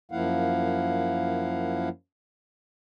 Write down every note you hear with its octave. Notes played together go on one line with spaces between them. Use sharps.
F#2 F3 A#3 E4 F5 F#5